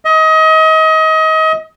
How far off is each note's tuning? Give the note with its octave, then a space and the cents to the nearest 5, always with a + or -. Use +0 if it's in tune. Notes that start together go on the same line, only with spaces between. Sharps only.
D#5 +30